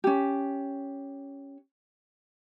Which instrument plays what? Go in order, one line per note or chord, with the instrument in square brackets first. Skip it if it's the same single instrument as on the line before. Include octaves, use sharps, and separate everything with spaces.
[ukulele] C#4 G4